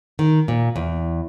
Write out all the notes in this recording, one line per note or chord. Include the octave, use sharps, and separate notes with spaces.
D#3
A#2
E2